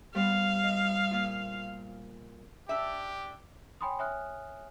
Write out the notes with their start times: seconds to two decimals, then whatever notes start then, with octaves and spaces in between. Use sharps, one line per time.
0.15 G3 B3 C5 F5
0.64 D#5
1.11 A#2 F4
2.69 D4 G4 E5
3.81 C#5 G5 G#5 B5 C6 D#6
3.99 C#5 E5 G#5 D#6 F6 F#6